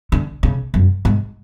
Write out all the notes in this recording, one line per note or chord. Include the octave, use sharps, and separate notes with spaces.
D3
C#3
F#2
G#2